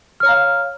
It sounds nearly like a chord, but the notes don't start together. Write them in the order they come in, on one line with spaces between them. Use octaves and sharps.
F6 C#5 A#5 F5